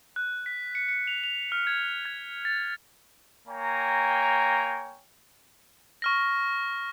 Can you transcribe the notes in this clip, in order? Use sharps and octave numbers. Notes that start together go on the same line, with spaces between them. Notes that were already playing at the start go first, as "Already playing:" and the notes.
F#6
B6
C#7
C#7
F7
F7
F6
G#6
G#6
A6
A#3 C#5 G5 G#5 A#5
C#6 F6 A#6